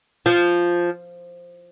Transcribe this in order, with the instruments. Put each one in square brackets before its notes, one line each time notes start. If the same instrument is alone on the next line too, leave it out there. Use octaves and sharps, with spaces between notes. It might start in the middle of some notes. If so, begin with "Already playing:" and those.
[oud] F3